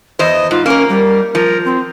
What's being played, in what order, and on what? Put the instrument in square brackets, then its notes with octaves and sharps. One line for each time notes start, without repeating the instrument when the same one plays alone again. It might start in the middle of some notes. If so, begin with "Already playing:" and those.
[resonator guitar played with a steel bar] E2 C5 [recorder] D#5
[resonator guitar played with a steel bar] G#2 [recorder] F4
[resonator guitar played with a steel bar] A#3 A#4 [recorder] C#4
[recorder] G3
[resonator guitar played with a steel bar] F3 [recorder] A#4
[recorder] C4